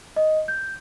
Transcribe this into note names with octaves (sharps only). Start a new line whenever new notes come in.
D#5
G6